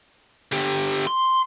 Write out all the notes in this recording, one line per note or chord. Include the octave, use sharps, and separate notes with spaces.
D3 G4
C6